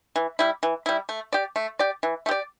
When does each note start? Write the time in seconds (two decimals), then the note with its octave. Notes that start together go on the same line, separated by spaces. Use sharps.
0.16 E3
0.39 G3 E4
0.63 E3
0.86 G3 E4
1.09 A3
1.33 G4 D5
1.56 A3
1.79 G4 D5
2.03 E3
2.26 A3
2.29 G4 D5